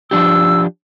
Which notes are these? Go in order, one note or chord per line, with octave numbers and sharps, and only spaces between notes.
F3 D4 G4 E6